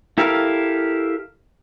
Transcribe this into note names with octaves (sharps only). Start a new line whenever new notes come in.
E4 G4 A4 A#4 F5